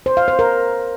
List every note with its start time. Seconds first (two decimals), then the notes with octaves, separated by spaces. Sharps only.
0.06 C5
0.17 F5
0.28 C5
0.39 A#4